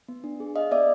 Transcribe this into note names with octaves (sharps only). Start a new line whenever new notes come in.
B3
D4
G#4
G#4 D#5 F5
B3 D5 E5